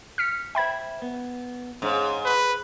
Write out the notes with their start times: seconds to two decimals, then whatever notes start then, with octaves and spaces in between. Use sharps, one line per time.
0.18 F6 B6 C#7
0.55 C5 E5 G5 B5 G#6
1.02 B3
1.82 G#2 C#4 C#5 F5
2.25 B4 C5